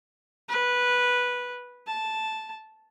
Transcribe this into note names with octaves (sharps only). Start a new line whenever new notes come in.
B4
A5